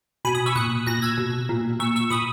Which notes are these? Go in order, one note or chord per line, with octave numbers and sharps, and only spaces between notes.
B2 G#5 B5
B5 D#6
C#6 E6
A#2 D#6 F#6
A#2 F#6 A#6
E6 G#6
B2
A#2
A#2 C#6 E6
C#6 E6
A#2 B5 D#6